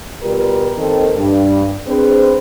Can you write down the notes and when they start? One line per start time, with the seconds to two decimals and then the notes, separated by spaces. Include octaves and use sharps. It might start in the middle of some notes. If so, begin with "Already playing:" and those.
0.22 B2 G3 F4 A#4 B4
0.77 D#2 D#3 C4 A4 A#4
1.14 G2
1.87 C4 D4 G#4 B4 C5